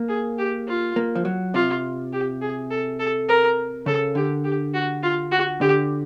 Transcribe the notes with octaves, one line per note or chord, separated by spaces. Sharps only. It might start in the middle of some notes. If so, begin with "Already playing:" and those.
Already playing: A#3
G#4
G4
F4
A#3
F3
F#3
C3 F4
G4
G#4
A4
A4
A#4
C#3 A4
D3 G4
G4
F#4
F4
F#4
D3 G4